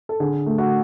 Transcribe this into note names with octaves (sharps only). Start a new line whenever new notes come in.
A4
D3 G#4
A3
F#4